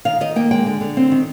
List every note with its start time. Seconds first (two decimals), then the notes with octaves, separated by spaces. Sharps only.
0.05 D#3 F5
0.21 D#3 D#5
0.36 A#3 G5
0.51 G#3 G5
0.66 D3
0.81 D3
0.97 C4
1.12 D#3